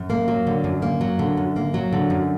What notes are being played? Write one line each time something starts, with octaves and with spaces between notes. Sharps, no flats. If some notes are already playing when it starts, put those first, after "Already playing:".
Already playing: F#2
A#3
F#3
D3
F#2
A#3
F#3
D3
F#2
A#3
F#3
D3
F#2